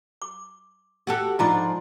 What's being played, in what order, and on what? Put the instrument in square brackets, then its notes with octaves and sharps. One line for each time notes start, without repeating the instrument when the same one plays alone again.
[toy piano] D6
[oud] F#4 G4 A4
[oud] G#2 F3 D4 [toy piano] F4 A#5 D6